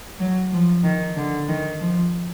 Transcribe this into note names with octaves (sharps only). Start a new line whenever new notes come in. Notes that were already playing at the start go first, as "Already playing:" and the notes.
F#3
F3
D#3
D3
D#3
F3